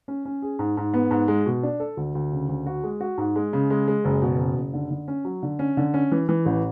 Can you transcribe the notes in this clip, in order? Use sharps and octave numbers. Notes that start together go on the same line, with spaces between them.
C#4
C#4
G#4
G#2
G#2
B3
G#2
G#3
B2
D4
A4
D2
D2
C#3
D2
F#4
G#3
F#4
G#2
G#3
C#3
G#3
G#3
F#1
B2
F#1
F#1
D3
D3
C#4
F#3
D3
C#4
D3
C#4
E3
E3
A1